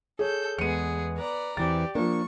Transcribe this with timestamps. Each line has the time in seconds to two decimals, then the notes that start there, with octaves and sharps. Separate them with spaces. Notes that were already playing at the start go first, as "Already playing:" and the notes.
0.19 G#4 A4 C#5 G6
0.58 E2 G#3 B3 G#4 C#7 D#7
1.15 B4 D5 A#5
1.57 E2 E3 C4 G4 D5 A6
1.95 F3 A#3 D4 C#6